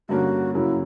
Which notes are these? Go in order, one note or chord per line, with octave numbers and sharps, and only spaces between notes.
G2 D3 A#3 C#4 F#4
F#2 C#3 F#3 A#3 E4